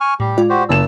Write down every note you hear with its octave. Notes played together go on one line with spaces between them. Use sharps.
G#5 C#6 F6
A2 G3 G4
G#3 F4 D5
F#4 G4 C5
F#1 A5 E6 E7